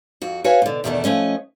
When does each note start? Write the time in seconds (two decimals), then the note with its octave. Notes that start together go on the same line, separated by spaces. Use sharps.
0.22 F2 F#4
0.44 F#4 B4 C#5 F5 G#5
0.62 B2 D3
0.84 E2 B2 D#3 G#3 A3 D4
1.04 F3 A3 C#4 D#5